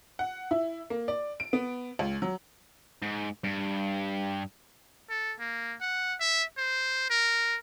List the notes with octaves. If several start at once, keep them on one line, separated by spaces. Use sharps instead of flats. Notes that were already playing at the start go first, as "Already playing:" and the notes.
F#5
E4
A#3
D5
D7
B3
C#2
F#3
G#2
G2
A4
A#3
F#5
E5
C5
A#4